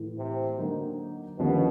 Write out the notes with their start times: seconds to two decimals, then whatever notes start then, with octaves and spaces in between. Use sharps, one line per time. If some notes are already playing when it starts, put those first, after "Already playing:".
Already playing: A2 E3 A3
0.18 C3
0.58 D3 F#3 A#3 D#4 F#4
1.38 D#2 B2 D3 F3 A#3 C#4